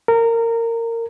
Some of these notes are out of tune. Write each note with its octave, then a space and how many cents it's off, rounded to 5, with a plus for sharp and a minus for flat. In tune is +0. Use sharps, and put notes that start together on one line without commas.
A#4 -20